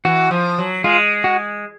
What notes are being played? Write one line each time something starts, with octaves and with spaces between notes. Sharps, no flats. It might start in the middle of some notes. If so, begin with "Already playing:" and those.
E3 F#4
F3
F#3
G#3 F4
F#4